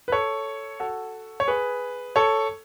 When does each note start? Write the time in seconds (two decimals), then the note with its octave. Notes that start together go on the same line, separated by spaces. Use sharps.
0.08 B4
0.12 A4 C#5
0.80 F#4 A4
1.40 C#5
1.47 G#4 B4
2.16 A4 C#5